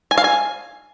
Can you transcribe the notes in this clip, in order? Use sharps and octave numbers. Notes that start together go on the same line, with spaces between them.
G#5
F5
G#5